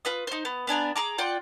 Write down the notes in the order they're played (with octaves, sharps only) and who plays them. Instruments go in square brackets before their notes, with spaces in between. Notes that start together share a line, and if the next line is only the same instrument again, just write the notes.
[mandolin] F4 B4 D#6
D#4 C5
B3
B3 D4 G#5 A#5
G#4 A#5 D6
F4 D5 F#5 G5